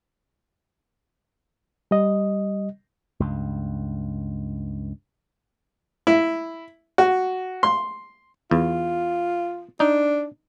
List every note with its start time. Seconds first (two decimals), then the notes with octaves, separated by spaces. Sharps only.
1.91 G3 D#5
3.20 C#2 G2
6.07 E4
6.98 F#4
7.63 C6
8.51 E2 F4
9.80 D4 D#4